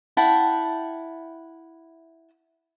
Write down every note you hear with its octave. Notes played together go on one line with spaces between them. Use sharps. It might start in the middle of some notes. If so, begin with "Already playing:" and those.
E4 F#5 G5 A5